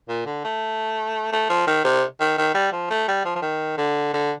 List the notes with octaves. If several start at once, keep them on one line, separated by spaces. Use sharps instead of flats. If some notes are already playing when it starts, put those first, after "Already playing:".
A#2
D3
A3
A3
F3
D#3
C3
D#3
D#3
G3
F3
A3
G3
F3
F3
D#3
D3
D3